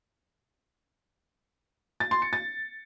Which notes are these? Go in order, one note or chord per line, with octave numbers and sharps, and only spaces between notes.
A6
C6
C#7
A6